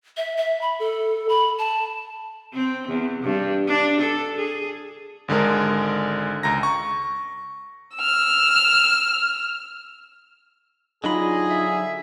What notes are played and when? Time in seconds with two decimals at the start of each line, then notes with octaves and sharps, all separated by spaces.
0.17 E5
0.37 E5
0.61 B5
0.79 A4
1.29 B5
1.58 A5
2.54 C4
2.88 E2
3.23 G2
3.67 D4
4.01 A4
4.37 G#4
5.28 G#1 D3 G#3 A#4
6.43 C#2 A#5 A#6
6.63 C#6
7.96 E6 F6
11.04 D3 F#3 D4 D#4 F4 G#4 D#5 B5
11.50 E5